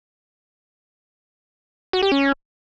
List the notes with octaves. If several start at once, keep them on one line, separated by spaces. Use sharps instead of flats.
F#4
G4
C#4